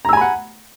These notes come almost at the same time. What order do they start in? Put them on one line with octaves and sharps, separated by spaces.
A#5 E6 G#5 B5 F#5